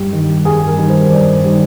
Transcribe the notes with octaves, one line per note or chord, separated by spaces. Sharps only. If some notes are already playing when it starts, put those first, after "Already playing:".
Already playing: G2 G4
D#3 G3
G2 G#4
A#4
D#3 G3
C5
G2 D5
D#3 G3